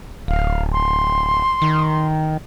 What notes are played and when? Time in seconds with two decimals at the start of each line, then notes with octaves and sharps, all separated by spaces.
0.28 D1 F5
0.72 C6
1.62 D#3